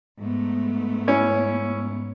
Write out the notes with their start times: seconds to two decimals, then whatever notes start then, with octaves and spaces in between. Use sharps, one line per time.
0.18 G#2 A3 B3
1.07 C#4 E4